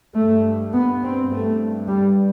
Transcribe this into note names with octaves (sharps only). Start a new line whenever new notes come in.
G2 A3
B3
C4
G2 A3
G3